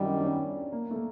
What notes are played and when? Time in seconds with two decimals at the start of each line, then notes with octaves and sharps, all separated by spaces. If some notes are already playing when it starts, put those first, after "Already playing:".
Already playing: F#2 D#3 G3 D4 E4
0.09 C#4
0.20 D4
0.25 C#4
0.72 A#3
0.91 A3
0.96 A#3